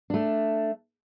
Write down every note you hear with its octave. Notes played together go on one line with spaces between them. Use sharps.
A3 D4